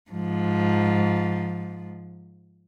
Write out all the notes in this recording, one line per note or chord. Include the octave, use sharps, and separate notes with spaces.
G#2 F3